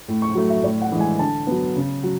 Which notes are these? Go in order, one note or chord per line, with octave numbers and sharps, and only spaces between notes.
A2
C#6
F#3 A3
E5
A2 D5
F#5
E3 G#3
G#5
D3 A5
F#3 B3
C#3
F#3